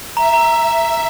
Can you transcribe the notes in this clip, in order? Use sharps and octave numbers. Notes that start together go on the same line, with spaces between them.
E5 A#5
A#5